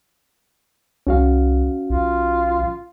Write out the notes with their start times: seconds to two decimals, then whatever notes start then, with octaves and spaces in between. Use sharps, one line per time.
1.07 C2 C#4 F#4 F5
1.90 B1 F4